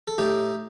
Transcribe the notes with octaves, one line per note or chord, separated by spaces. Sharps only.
A4
A2 D#4 G4